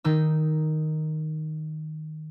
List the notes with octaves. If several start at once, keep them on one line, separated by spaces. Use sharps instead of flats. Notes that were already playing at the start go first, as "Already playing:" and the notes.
D#3 D#4 E6